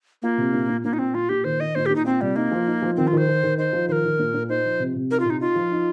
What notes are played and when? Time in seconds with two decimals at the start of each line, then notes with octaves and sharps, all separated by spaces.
0.22 A#3 F4
0.38 C3
0.53 A#2
0.69 A#2
0.84 A#2 A#3
0.93 D#4
0.99 A#2 C4
1.14 A#2 F4
1.29 A#2 G4
1.44 D#3 C5
1.60 D#3 D#5
1.75 A#2 C5
1.86 G4
1.90 A#2
1.96 D#4
2.05 C4 F4
2.21 C3 G3
2.36 A#3 D#4
2.51 F3
2.67 D#4
2.82 F3
2.96 D#3 C4
3.07 F4
3.13 D#3 C5
3.28 D#3
3.43 D#3
3.58 D#4 C5
3.73 F3
3.88 D#3 C5
3.92 A#4
4.04 D#3
4.19 A#2
4.34 A#2
4.49 D#4 C5
4.65 F3
4.79 C3
4.94 C3
5.11 D#4 A#4
5.20 F4
5.25 C3
5.30 D#4
5.41 D#4 F4
5.55 F3
5.72 D#4